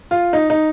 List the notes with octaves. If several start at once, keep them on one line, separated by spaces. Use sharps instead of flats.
F4
D#4
D#4